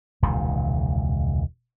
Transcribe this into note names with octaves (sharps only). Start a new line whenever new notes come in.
E1 C#2 A#2 D#3